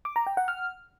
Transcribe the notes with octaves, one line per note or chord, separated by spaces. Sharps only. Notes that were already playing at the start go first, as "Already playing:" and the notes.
D6
A#5
G5
F#5
F6